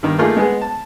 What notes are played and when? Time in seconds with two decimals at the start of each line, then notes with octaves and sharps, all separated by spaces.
0.03 G2 D#3
0.19 A3 A#3 D#4 F4 G#4
0.37 G#3 B3 G#4
0.61 A5